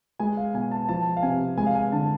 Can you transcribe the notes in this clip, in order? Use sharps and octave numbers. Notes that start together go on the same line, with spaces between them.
G#3 G#5
F5
B2 G#5
A5
F3 A5
F5
C3 G#5
G#3 G#5
F5
G#5
D3 A5